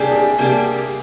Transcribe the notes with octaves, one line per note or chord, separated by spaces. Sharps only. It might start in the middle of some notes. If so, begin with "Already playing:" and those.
Already playing: C3 G3 A#3 D4 G4 G#4
G#4
C3 G3 A#3 D4 G4